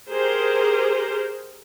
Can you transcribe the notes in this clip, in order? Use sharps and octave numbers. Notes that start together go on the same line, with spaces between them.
G4 G#4 A#4 C5